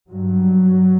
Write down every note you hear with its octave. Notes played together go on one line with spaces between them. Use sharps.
G2 F#3